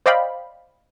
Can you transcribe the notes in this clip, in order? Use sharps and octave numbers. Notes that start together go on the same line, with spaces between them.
C5 D5 D#5 F5 G5 B5